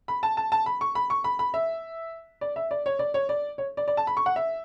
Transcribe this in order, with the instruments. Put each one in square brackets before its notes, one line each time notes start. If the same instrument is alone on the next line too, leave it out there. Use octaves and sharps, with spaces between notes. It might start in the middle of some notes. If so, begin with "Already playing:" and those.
[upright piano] B5
A5
A5
A5
B5
C#6
B5
C#6
B5
B5
E5
D5
E5
D5
C#5
D5
C#5
D5
C#5
D5
D5
A5
B5
C#6
F#5
E5